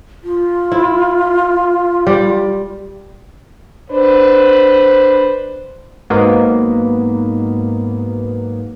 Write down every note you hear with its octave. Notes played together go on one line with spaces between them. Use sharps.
F4
E4
G3
D4 B4 C5
G#2 F#3 A#3 B3